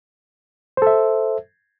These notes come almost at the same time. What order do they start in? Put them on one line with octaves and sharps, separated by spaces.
C5 A4 E5